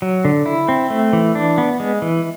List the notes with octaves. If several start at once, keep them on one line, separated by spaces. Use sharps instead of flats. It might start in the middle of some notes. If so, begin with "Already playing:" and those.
F#3
D3
E4
C4
A3
E3
D4
B3
G#3
E3